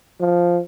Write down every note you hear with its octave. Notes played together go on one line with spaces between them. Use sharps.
F3